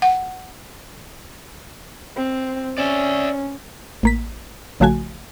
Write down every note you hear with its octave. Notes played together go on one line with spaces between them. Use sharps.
F#5
C4
C#4 D5 E5
A1 A#3 B6
A#1 C#3 F3 A3 F#4 G#5